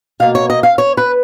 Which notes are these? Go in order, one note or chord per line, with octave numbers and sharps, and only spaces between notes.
B2 A#3 F5
C#5
D#5
F5
C#5
B4